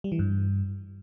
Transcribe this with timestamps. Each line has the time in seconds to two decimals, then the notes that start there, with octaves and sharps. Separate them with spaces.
0.04 G3
0.12 E3
0.19 G2